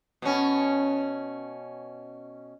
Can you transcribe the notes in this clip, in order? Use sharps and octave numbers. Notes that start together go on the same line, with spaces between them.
B2 C#4